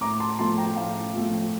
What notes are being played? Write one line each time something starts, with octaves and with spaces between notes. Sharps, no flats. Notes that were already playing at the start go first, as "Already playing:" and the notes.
A2 A#5 D6
A5 C6
F3 A3 A5 C6
G5 A#5
A2 F5 A5
F3 A3